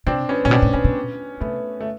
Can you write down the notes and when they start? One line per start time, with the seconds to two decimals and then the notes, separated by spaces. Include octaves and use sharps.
0.07 C3 C4 D4
0.29 B3 C#4
0.45 A#2 C#4
0.51 B2 C4 D4
0.62 A2
0.73 A#2 B3 C#4
0.84 B2
1.41 C3 A3 B3
1.80 A3